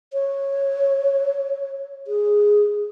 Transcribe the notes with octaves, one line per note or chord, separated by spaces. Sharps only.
C#5
G#4